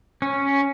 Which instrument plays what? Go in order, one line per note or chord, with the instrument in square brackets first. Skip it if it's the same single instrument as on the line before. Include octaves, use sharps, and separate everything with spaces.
[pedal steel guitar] C#4